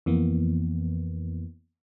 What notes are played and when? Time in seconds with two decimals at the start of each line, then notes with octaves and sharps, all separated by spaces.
0.06 F2 E3 A#3 B3